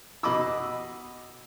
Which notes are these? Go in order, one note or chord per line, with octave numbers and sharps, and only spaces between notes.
B2 D#5 B5 D6 E6